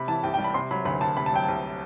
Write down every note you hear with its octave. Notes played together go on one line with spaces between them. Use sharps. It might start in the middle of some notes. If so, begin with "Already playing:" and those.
Already playing: C3 B5
E3 A5
C2 G5
G5
G3
B5
C3 C6
F#3 B5
D2 B5
D2 A5
C3 B5
A5
F#3 G5
C2 A5